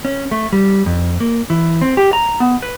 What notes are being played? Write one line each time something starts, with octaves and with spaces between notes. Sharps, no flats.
C#4
A3
G3
F2
A#3
E3
C4
G4
A#5
B3
B4